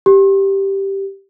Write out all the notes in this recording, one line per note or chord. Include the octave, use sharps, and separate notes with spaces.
G4